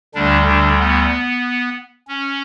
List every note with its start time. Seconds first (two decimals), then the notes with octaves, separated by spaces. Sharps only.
0.15 D2 D3 G3 D4
0.47 D3 D4
0.80 B3
2.08 C#4